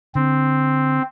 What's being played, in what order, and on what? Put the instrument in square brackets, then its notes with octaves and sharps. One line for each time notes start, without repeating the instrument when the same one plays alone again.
[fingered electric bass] D3 [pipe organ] C4